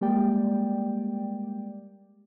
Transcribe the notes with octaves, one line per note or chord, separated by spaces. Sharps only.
G3 G#3 A#3 G4 D5 G5